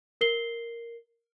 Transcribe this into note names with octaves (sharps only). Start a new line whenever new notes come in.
A#4 C7 G7